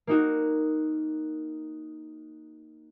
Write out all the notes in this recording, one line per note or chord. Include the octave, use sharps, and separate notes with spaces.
A#3 D#4 F#4